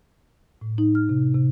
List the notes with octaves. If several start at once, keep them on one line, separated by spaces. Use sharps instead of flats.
A2
D#4
F6
C3
C3